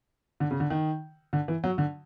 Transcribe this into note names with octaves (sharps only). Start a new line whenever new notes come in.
D3
C#3
D3
D#3
D3
E3
F#3
D3